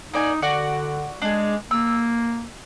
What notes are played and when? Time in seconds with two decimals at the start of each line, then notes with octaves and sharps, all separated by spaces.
0.14 A#3 D#4 D5 G#5
0.42 D3 F#4 D5 F#5
1.22 G#3 D4 G#4
1.71 A#3 E6